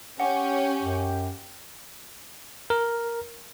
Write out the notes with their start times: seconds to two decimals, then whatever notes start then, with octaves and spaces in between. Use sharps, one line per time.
0.20 C#4 G4 F#5 G5
0.82 F#2
2.70 A#4